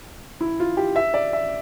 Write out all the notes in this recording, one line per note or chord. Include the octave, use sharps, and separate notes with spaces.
E4
F4
G4
E5
D5
E5